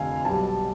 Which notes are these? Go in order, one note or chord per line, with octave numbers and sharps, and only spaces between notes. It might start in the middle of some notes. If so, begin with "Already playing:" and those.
Already playing: F1 F2 D3 F5 G#5
B1 B2 G3 A5